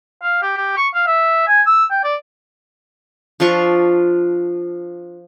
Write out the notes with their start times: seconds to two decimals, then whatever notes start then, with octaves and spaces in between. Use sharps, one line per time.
0.23 F5
0.42 G4
0.57 G4
0.77 C#6
0.94 F5
1.07 E5
1.47 G#5
1.66 E6
1.91 G5
2.04 D5
3.40 F3 D4 F4 C#6